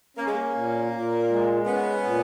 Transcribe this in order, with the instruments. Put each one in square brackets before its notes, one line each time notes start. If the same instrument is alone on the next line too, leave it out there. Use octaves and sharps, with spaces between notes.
[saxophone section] A#3 [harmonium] C#4
[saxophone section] G#3
A#3
[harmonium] A#2
A#2
G#3
[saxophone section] B3 [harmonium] C#4
[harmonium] A#2